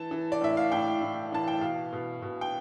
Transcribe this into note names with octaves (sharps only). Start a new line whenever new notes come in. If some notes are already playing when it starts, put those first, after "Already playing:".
Already playing: E3 A5
E3
D5
A2 E5
F5
A2 G5
A2
E3 A5
G5
B2 F5
B2
B2
G5